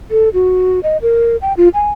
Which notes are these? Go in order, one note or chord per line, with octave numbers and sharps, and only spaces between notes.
A4
F#4
D#5
A#4
G5
F4
G#5